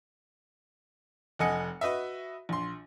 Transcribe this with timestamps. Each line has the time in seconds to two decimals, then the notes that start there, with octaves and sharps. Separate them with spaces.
1.39 F1 A4 D#5 F#5 G#5 C#7
1.81 F#4 B4 D#5 E5
2.49 A#1 C6